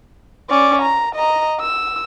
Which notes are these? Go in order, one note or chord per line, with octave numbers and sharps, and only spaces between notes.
C#4 D5
A#5
D#5 A#5
E6